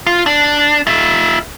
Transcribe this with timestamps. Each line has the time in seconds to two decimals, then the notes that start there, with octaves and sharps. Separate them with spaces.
0.07 F4
0.26 D4
0.87 F4 E5